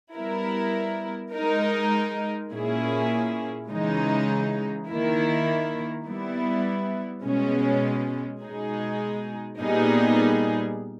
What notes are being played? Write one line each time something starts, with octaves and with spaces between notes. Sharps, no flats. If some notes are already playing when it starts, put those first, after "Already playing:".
G3 B3 E4 A#4
G#3 D#4 A#4
A#2 A#3 C#4 E4 G#4
C#3 E3 G#3 D#4
D#3 A#3 E4 A#4
G3 B3 E4
B2 G#3 C#4
B2 G#3 D#4 G#4
A#2 G3 B3 D#4 G#4